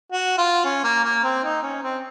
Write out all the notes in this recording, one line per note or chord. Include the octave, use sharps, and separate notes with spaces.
F#4
F4
C#4
A#3
A#3
C4
D#4
C#4
C4